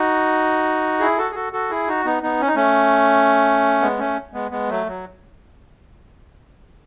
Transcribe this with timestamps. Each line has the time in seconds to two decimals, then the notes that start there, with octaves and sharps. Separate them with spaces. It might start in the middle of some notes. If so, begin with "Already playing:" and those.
Already playing: D#4 F#4
1.00 E4 G#4
1.17 F#4 A4
1.30 G#4
1.35 F#4 A4
1.53 F#4 A4
1.70 E4 G#4
1.88 D#4 F#4
2.05 B3 D#4
2.23 B3 D#4
2.41 C#4
2.48 D#4
2.55 A3 C#4
3.81 G#3 B3
3.99 A3 C#4
4.34 G#3 B3
4.51 G#3 B3
4.69 F#3 A3
4.87 F#3